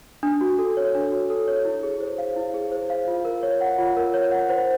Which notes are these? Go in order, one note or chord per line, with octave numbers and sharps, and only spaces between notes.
D4
F#4
A4
C#5
D4
F#4
A4
C#5
E4
G#4
C5
F5
E4
G#4
C5
F5
F4
A#4
C#5
F#5
F4
A#4
C#5
F#5
C5